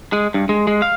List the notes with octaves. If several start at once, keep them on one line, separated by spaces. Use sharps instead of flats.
G#3
G2
G#3
G#3
F5